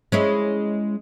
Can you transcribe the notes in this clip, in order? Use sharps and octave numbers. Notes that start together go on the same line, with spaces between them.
G#3 C#4 E4